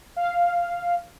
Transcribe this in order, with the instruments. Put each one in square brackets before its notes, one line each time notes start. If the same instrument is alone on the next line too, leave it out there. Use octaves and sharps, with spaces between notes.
[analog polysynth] F5